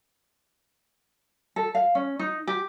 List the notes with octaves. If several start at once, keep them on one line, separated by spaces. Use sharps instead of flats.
A4
F5
C#4
D#4
G4